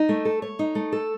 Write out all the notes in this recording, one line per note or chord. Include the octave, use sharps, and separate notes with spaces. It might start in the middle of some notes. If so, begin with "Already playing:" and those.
Already playing: D#4
A3
A4
C#5
D#4
A3
A4